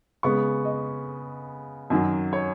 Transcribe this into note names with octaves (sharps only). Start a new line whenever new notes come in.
C#3 G#3 B3 C#6
D#5
F#2 D#3 F#3
C#5